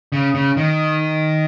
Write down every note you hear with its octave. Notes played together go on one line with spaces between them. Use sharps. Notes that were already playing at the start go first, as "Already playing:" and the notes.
C#3
C#3
D#3